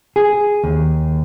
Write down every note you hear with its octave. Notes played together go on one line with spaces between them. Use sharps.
G#4
D#2